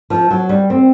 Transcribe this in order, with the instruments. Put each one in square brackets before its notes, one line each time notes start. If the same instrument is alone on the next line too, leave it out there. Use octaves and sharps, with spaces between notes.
[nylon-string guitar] F3
F#3
G3
C4